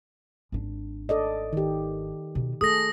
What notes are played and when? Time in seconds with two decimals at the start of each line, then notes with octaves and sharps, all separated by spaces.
0.52 G#1 D4
1.09 A4 D5 D#5
1.53 D#3 G4
2.35 B2
2.61 A3 G#4 A4 D#6 A#6